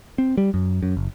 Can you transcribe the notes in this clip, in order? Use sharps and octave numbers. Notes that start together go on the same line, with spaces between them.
C4
G3
F#2
F#2
F#1